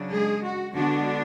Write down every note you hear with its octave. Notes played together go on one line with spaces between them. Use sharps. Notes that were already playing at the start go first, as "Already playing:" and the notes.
Already playing: C#3 F#3 D4
G#3 G#4
F#4
D3 G#3 B3 D4 F#4